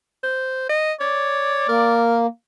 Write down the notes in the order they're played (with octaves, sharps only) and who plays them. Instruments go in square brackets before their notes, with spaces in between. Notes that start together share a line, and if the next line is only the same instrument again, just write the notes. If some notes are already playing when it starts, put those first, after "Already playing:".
[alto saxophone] C5
D#5
[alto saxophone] C#5 [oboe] D5
[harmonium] A#3 [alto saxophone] A#4